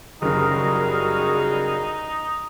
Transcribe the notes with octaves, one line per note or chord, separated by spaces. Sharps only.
F#1 C#3 G3 D#4 F#4 G#4 A#4